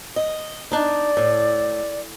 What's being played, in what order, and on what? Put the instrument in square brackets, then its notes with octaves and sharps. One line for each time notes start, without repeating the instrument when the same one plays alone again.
[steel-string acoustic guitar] D#5
[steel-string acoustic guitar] D4 D#4 [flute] D5
[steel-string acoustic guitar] A2